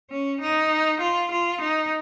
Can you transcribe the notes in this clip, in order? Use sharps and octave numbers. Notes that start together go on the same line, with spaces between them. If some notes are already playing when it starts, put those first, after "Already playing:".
C#4
D#4
F4
F4
D#4